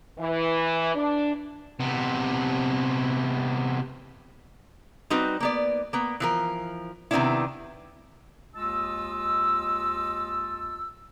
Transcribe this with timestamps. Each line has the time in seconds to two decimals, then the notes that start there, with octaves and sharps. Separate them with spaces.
0.19 E3
0.95 D4
1.80 C3 B3
5.10 G3 C4 D#4 F#4 B4
5.40 A#3 B3 D5
5.93 A#3 B3
6.20 E3 F3 A#4
7.11 C3 D#3 B3 C4 D4 E4
8.55 D#2 G#3 F4 D#5 A5 E6